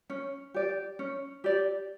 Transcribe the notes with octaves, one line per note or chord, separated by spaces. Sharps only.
C#4
G4 D5
C#4
G4 D5